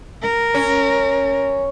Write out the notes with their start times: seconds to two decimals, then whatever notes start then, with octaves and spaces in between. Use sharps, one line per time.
0.22 A#4
0.54 C#4